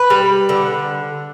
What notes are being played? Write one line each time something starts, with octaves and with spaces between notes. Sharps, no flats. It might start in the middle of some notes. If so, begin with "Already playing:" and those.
Already playing: B4
G3
D3